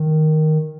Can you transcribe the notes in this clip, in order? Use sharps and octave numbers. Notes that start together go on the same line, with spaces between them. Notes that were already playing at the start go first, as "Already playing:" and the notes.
Already playing: D#3